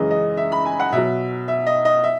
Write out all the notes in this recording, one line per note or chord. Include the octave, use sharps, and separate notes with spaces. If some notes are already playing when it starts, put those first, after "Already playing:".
Already playing: F#2 C#3 E3 G#3 D#5
D#5
E5
B5
G#5
F#5
B2 F#3 E5
E5
D#5
D#5
E5